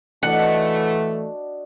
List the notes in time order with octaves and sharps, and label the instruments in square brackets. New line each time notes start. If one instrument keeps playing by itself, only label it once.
[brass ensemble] E3 A3 [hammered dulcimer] D4 F#4 D#5 [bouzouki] F#5